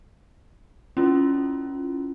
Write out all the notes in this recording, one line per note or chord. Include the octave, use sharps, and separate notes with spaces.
C#4 E4 F4